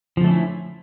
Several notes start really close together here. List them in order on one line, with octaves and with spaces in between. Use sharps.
F3 D3 A3 C#4 E4